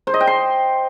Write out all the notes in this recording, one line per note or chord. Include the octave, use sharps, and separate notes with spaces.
C5
D#5
G5
C6